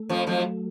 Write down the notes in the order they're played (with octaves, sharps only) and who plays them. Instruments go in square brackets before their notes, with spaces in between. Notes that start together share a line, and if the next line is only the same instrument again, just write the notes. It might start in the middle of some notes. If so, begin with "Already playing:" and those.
Already playing: [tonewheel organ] A3
[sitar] F2 F3
[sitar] F2 F3 [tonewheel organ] F#3